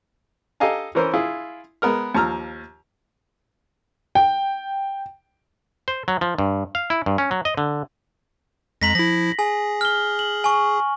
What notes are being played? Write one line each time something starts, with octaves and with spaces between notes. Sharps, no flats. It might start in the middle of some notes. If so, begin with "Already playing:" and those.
G4 A4 D#5 F5 G#5 A#5
E3 C#4 A#4 C5
E4 F4 G#4
G#3 B3 A#4 F6
D#2 F3 A5 A#5 E6 F6
G5
C5
F#3
F3
G2
F5
E4
G2
C#4
F#3
D#5
D3
F2 G#3 A#5 A#6 B6 F#7
F3 E4 A#6
G#4 G#5
F6 G7
F#7
G#5 C#6